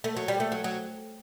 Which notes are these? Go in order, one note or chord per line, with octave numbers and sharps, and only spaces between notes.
A3
F#3
G3
A3
F#3
F#3